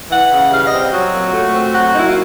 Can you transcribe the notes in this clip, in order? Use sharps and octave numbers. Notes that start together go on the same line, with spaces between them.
E3 F#5
C#3
G3 F5
D#5
C4
F#3 F#4
A#2
A3
C4
F#3 F#4
A#2 D#4
E4
F4